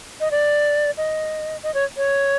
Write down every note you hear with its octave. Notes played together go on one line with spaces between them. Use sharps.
D#5
D5
D#5
D#5
C#5
C#5